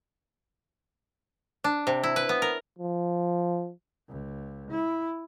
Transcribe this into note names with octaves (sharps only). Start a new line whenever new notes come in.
D4
C3
E4
B4
B3
A#4
F3
C#2
E4